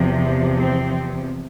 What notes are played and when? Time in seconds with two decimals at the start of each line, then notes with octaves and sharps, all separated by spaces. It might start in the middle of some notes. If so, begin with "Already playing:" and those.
Already playing: E2 C3 F3
0.59 C4